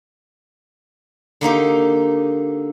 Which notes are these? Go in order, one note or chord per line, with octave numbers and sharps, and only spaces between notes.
D3 A#3 D#4 G4